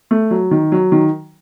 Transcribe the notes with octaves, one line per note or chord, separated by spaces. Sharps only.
A3
F#3
D#3
F#3
D#3